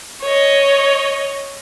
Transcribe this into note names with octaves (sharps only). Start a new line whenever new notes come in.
C#5 D#5